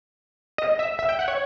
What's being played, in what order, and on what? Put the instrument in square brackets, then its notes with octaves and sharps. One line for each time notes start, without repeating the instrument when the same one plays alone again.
[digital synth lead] D#5
E5
E5
G5
F#5
C#5